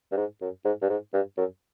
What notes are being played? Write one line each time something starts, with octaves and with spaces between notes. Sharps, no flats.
G2
G#2
F#2
G#2
G2
G#2
G2
F#2